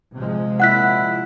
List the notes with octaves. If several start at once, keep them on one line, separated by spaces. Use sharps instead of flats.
C3 F3 G#3
A#2 E4 F#5 F#6 B6